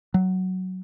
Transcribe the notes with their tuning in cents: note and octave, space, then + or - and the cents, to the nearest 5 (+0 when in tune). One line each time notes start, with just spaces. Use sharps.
F#3 +5